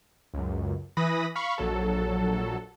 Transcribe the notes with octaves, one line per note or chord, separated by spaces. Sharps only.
C#2 F#2
E3 B4 B5 D#6 A#6
F5 B5 C#6
A#1 F#3 A4